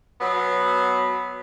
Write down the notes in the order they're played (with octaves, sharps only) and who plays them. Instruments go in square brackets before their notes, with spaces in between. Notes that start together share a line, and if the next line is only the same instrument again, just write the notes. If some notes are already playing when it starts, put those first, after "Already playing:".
[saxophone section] B2 F#3 B3